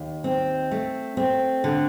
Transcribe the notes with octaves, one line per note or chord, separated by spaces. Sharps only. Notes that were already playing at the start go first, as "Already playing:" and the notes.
Already playing: D#2
C4
A3
C4
D3